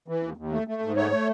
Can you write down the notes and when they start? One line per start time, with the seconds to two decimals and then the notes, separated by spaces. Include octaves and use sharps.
0.08 E3
0.23 D#2
0.37 D#2
0.51 A3
0.67 A3
0.82 G#2
0.96 A3 C#5
1.12 A3